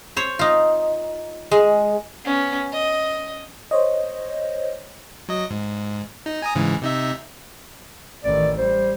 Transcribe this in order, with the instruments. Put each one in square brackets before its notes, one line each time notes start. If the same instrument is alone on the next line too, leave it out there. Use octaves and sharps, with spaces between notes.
[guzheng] C5 C#5
D#4 F4
G#3
[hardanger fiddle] B3 C#4
D#5
[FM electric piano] C5 C#5 D#5
[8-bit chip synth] F#3 D#5
G#2
D#4
G#5 A#5 D#6
G#2 C#3 E3
C3 D#4 E5
[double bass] A1 D#3 [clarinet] D5
[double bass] G3 [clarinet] C5